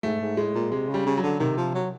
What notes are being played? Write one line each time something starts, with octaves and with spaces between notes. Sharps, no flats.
G#2 A3
G#2
A2 G#3
A#2
C3 G#3
C#3
G3
C#3
F#3
D3
C3 D#3
F3
F#3